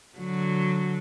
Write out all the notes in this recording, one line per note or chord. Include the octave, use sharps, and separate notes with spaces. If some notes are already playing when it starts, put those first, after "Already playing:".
D3 F#3